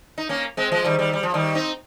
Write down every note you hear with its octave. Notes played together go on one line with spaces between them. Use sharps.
D#4
A#3 C#4
G#3 C4
F3 G#3
D#3 G3
D#3 G3
G3
F3
D#3 G3
C4 D#4